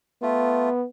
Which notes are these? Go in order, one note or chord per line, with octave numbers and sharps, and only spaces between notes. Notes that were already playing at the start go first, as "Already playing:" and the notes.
A3 B3 F4